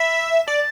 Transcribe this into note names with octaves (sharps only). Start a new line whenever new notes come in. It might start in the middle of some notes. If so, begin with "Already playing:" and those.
Already playing: E5 B5
D5 A5